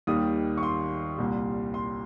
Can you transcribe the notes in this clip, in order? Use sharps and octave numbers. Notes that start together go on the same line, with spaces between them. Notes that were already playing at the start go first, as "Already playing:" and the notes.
D#2 D#3 G3 D#6
C#6
C6
C2 A#2 G3
C6